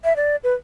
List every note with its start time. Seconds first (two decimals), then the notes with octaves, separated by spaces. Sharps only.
0.04 E5
0.16 D5
0.44 B4